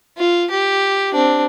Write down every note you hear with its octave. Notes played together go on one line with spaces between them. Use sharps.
F4
G4
C4 D4